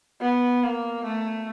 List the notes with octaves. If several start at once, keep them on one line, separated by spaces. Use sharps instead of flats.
B3
A#3
A3